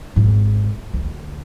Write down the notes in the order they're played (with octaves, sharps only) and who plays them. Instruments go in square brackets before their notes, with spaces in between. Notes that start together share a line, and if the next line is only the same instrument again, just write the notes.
[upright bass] G#1 G#2
D2